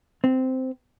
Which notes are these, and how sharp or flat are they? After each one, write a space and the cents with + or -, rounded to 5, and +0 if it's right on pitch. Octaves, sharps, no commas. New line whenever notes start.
C4 -10